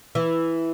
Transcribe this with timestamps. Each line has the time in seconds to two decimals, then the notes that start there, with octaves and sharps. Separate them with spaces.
0.15 E3